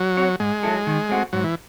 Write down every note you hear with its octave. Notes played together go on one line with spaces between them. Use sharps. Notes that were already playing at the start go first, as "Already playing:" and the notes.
Already playing: F#3
C4 F#4 C#5
G#2 G#3
F#3 C#4 E4 A4
D#3
A3 C4 F#4
G#2 F#3
E3